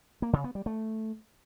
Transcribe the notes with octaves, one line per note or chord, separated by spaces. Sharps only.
A#3
C#3
B3
G3
A3